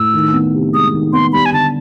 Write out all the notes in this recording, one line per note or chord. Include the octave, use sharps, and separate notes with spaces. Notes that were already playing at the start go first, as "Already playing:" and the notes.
Already playing: A2 E6
D#3
B3
C3
G#3 D#6
D#3
B3 C6
G3 B5
G#5
D3 A5